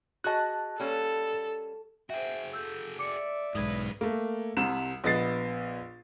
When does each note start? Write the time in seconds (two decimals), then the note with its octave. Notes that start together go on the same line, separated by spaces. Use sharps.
0.24 F#4 G#4 D#5 A5 F#6
0.80 G3 A#3 C#4 A4
2.10 F#4 G#4 C5 E5 G5
2.53 A4 E6 G6
2.99 D5 E5 D6 C#7
3.55 B1 G#2 G3 B4 D#6 G#6
4.01 A3 A#3
4.57 C2 C3 E7
5.04 A#1 B3 D#5 A6 C7